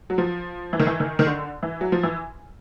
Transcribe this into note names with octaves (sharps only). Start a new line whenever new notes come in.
F#3
F3
E3
D#3
E3
D#3
D#3
D3
E3
F#3
F3
E3